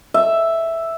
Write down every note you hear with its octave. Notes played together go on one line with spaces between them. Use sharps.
E5